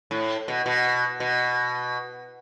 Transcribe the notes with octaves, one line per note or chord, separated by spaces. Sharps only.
A2
B2
B2
B2